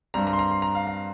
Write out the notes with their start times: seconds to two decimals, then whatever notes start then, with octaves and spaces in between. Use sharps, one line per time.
0.14 G2 G3 C4 A#5
0.27 A#5
0.33 C6
0.39 A#5
0.51 C6
0.62 A#5
0.75 F5
0.87 F5